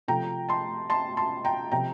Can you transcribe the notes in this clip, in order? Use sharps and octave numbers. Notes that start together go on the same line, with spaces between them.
C3 F3 A3 G5 A#5
A5 C6
A5 C6
A5 C6
G5 A#5
C3 F3 G5 A#5